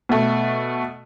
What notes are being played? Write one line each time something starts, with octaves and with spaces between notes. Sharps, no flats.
B2 A3